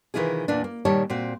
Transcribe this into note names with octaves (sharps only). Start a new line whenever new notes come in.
C3 D#3 E3 E4 F4 G#4
E2 A#2 A#3 D4
A#3
A#2 D#3 G3 C#5 A5
A#2 C4 F#4